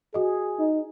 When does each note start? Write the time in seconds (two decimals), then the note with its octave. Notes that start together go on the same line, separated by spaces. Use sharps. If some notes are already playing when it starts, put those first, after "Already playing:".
0.14 F#4 G#4 D#5
0.59 D#4